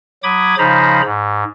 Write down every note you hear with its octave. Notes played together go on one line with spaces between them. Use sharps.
F#3 B5 D6 D#6 G#6
C#3 F3 D#4 C5 A#5 B5
G#2